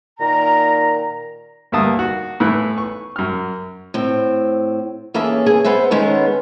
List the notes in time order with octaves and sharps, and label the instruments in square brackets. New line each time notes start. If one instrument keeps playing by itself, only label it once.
[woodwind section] A#2 D#3 A#5
[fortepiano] D2 G2 A#3 E5 A5 D#6
F#4
A2 E3 B3 E4 B5 F#6
C#6
F#2 F6
[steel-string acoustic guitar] A2 C4
E3 A#3 C#4 G#4 A4 E5
G#4
B3 B4 C5 E5
D#3 G#3 B3 C#4 A4